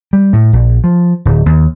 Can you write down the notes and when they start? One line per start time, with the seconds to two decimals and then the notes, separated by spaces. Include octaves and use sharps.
0.13 G3
0.33 A2
0.53 A#1
0.84 F3
1.25 D1
1.46 D#2